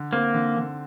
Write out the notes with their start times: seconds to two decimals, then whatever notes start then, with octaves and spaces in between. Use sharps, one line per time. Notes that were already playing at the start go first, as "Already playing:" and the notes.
Already playing: D3
0.13 A#3 C4
0.34 D3
0.57 D3